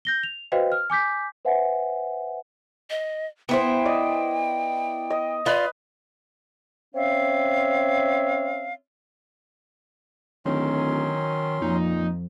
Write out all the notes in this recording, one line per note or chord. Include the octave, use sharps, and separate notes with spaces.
G6 A#6 G7
F7
F#4 B4 C5 D#5 F5 G5
F6
G#5 D6 G6 B6
B4 C5 E5 F#5 G#5
D#5
B3 E4 C5 G5
D5 D#5
D#5
F4 B4 D5 D#5
C4 C#4 C#5 E5 F5
D1 D#3 F#3 C#4 C6
F2 A#2 D#4